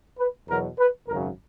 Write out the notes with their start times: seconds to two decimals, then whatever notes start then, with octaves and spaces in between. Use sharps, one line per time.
0.18 B4
0.48 E2 B2 F#3 A#4
0.78 B4
1.07 G#1 F#2 C#3 A#4